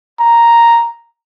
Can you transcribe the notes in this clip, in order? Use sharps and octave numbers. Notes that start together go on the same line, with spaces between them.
A#5